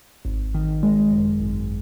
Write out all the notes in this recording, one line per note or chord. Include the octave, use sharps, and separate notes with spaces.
G#1
D#3
G#3
F#2
G#1